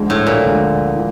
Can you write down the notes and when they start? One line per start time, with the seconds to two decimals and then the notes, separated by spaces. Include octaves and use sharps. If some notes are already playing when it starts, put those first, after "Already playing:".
Already playing: D2 D3 F3 G#3
0.10 A2
0.27 A#2
0.44 D2 D3 F3 G#3
0.96 E3